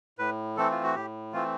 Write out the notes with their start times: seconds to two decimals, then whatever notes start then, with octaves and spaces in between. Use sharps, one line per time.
0.19 A2 B4
0.57 E3 A3 C4 A4
0.71 F4
0.84 F#4
0.95 A2 G4
1.33 E3 A3 C4 F4